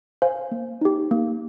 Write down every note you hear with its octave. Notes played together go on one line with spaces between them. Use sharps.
C5 F5 G#5
A#3
D#4 G4
A#3